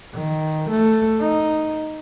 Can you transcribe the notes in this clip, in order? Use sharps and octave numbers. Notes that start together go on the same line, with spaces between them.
D#3
A3
D#4